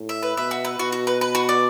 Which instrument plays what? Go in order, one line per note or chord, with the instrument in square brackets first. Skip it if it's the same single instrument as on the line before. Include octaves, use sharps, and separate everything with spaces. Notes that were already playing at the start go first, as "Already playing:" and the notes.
Already playing: [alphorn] A2
[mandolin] E5
B4
[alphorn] B2 [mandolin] E5
[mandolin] F#4
B4
[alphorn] B2 [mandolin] F#4
[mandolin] F#4
B4
B4
F#4
D5